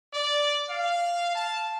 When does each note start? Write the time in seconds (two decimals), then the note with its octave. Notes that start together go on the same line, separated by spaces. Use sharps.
0.14 D5
0.70 F5
1.34 A5